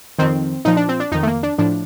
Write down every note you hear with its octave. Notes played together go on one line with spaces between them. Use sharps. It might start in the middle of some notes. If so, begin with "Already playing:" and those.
F2 D#3 C4
A#2 F3 D#4
D4
C4
D4
F2 D#3 D#4
A3
A#3
D4
A2 F3 D4